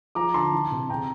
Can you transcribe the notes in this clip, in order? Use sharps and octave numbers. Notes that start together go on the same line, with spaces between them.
F3 A#5 D6
D3 A5 C6
E3
C3
C3 G5 A#5